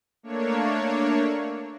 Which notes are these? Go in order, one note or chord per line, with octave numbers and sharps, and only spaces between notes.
A3 A#3 D4 C#5